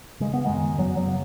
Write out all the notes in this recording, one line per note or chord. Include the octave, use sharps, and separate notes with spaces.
C#3 G#3
B3
F#2 D#3 G#3
F#2 F#3 B3
F#3 B3
C#3